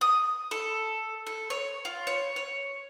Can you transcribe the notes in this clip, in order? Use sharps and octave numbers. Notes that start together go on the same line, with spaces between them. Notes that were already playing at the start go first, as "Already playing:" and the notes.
D#6
A4
A4
C#5
F4
C#5
C#5